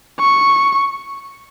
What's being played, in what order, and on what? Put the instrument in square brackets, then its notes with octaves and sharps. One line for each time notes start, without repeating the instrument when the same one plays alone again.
[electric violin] C#6